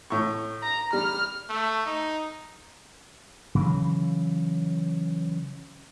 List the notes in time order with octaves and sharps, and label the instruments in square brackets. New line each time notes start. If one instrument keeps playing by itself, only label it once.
[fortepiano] A2 C#6
[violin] A#5
[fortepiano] G3 [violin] F6
[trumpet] A3
D#4
[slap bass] C#3 E3 F#3